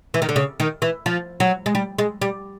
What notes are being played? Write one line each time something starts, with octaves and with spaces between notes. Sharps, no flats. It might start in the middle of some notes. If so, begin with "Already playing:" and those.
E3
D#3
D3
C#3
D#3
E3
F3
F#3
G#3
G3
G#3
G3